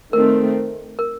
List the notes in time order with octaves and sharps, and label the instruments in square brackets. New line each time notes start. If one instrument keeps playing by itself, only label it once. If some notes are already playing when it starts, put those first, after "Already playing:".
[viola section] D#3 A3 C4 [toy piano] A#4
[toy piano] A#4